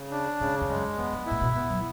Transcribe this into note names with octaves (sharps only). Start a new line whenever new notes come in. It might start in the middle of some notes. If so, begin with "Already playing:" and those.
Already playing: C#3
D4
G#2 C#3
E2
F#2 G#3
E2 B3
F#2
A2 E4
B2
C#3 B3
F#3